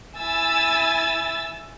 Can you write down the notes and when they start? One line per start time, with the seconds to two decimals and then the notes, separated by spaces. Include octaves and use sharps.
0.18 E4 G#5 E6 A6